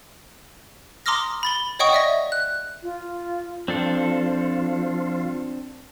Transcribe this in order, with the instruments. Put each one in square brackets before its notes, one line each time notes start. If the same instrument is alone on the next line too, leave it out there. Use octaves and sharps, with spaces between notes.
[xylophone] A#5 C6 D6 D#6 F6 A#6
B5 A6 G7
C#5 D#5 F#5 G5 C#6 D#6
D5 E5 A#6
F#6
[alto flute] F4
[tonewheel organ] F3 F4 [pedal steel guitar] C4 D4 A4